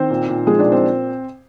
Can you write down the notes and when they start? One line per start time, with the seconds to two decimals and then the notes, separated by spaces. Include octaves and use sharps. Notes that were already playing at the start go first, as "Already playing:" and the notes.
Already playing: D#3 C4 C5
0.10 A#2
0.28 A#2
0.47 F3 G#3 G#4
0.59 D4 D5
0.66 A#2
0.72 C4 C5